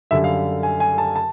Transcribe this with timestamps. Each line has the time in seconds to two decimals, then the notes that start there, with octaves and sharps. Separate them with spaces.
0.11 F#2 D3 G3 E5
0.24 F5
0.63 G#5
0.80 G#5
0.98 A5
1.16 A5